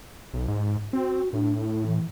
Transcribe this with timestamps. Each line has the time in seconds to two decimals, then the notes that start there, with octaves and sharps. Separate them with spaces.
0.33 B1
0.48 G#2
0.93 C4 F#4
1.33 A2 D4
1.60 E4
1.87 E3